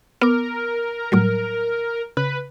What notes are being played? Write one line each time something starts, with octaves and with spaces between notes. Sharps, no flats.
B3 A#4 D6
A2 F#3 G3
C#3 B4